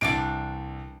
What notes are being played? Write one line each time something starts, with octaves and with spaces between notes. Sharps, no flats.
C2 E3 D4 D5 D7